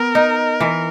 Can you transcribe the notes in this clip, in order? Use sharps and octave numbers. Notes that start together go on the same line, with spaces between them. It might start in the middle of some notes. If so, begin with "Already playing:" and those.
Already playing: B3 A#4
D#4
E3